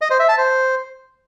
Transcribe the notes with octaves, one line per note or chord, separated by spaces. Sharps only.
D#5
C5
E5
A5
C5